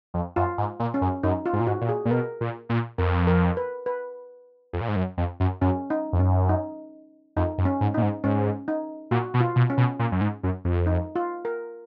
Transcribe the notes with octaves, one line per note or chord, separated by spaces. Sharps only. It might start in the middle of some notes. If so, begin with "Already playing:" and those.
F2
F#2 F4
G#2
A#2
C#4
F#2
F#2 D#4
F4
G#2
A#2
G#2 F#4
A#2
G#4
A#2
B2 A#4
A#2
A#2
F2 A#4
A#4
B4
B4
F2
A#2
G#2
F#2
F2
F#2
F#2 C#4
D#4
F2
F#2 C#4
D#4
F2 D#4
F#2
C#4
G#2
A#2 D#4
G#2
G#2 C#4
D#4
A#2 F#4
B2
F4
B2
C#4
B2
A#2
F#2
G#2
F#2
F2
D#4
F4
A#4